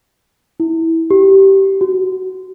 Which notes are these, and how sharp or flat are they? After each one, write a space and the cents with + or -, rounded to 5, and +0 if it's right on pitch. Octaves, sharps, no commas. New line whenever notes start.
E4 -15
G4 -15
F#4 +10